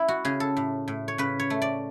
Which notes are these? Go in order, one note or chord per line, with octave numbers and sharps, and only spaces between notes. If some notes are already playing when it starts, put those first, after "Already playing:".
Already playing: E4
F#4
C#3 G#4
A4
A2
A2
C#5
C#3 B4
C#5
A3
D5